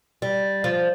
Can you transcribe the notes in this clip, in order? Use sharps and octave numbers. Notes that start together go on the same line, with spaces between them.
G3
F3